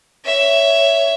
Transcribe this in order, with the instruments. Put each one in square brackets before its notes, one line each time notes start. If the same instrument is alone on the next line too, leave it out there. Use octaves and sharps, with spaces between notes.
[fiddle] C#5 E5